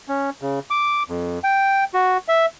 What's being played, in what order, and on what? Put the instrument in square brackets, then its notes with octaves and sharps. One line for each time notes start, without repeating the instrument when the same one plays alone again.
[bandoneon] C#4
C#3
D6
F2
G5
F#4
E5